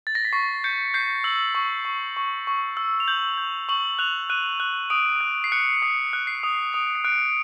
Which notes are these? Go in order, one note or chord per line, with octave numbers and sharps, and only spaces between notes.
A6
A#6
B6
C#6 C7
G6 C#7
G6 C7
E6 F#7
C#6
C#6
C#6
C#6
E6
F7
G6 F#7
G6
C#6 F#7
F#6 F7
F#6 D#7
F#6
D#6 D7
F#6
C7
F#6 C#7
D#6 C7
F#6
C7
D#6
D#6 D7
C#7
F#6 D7